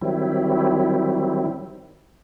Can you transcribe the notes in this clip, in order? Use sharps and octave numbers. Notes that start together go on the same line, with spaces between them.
D#3 F#3 G3 C4 E4